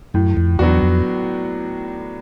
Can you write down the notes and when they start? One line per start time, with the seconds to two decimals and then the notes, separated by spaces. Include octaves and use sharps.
0.14 F#2 A2
0.37 F2
0.59 E2 F#3 B3 D4 F#4
0.82 F2